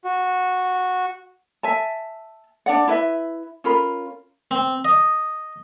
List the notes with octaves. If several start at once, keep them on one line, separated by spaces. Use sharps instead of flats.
F#4
E5 G#5 A5
D4 D5 F#5
E4 B4 E5
C#4 F4 A#4 B5
C4
D#5